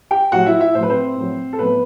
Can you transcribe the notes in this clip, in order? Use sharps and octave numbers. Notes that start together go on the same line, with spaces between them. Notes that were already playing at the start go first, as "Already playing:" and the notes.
G4 G5
A2 F#3 F#4 F#5
E4 E5
E4 E5
A2 F#3 B4 C5
C4 C5
A2 F#3
A4
A2 F#3 B3 B4